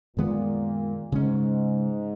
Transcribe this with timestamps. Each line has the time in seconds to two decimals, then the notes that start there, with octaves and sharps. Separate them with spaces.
0.17 F#2 A#2 D#3 G#3 B3
1.12 G#2 C#3 G#3 C#4